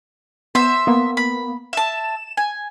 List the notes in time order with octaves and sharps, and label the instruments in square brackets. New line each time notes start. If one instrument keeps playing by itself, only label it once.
[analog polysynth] B3 E7 [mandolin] C5 E5
[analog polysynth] A#3 B3
[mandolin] B5
[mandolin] E5 A5 [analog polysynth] E7
[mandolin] G#5